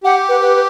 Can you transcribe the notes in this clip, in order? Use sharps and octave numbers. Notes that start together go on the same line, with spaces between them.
G4 F#5
B4
B4
B4